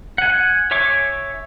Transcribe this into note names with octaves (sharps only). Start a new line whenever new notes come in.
F#5 G#5
C#5 E5 G#5 C#6 D6